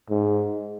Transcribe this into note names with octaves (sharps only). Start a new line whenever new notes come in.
G#2